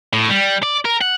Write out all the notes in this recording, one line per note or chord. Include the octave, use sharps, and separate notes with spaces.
A2
G3
D5
A#4
F#5